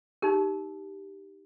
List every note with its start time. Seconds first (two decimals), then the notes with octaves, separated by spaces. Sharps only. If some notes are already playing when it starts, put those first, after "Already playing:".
0.22 D#4 G4 A#4